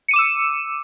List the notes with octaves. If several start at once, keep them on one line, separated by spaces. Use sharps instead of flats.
D6 E6 C#7 D#7 E7